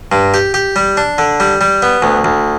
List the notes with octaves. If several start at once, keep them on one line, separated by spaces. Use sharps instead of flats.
G2
G4
G4
G3
D4
D3
G3
G3
B3
D2
D2